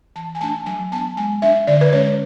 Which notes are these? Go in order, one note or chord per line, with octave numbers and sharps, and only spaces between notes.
E3 A5
G#5
A3 D4 A5
F#3 G#5
B3 D4 A5
G#3 G#5
D4 E5
D3 D5
B4
G#3 C#4 C#5